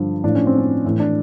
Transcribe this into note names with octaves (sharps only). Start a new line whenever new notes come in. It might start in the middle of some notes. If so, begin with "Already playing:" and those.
Already playing: G2 D3 F3
A2 F3 D4
C#4
C4
C#4
A2 E3
D4